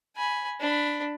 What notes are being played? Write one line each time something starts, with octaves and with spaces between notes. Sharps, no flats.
G#5 B5
D4 B5